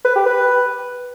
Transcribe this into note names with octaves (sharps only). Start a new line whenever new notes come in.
B4
G4
B4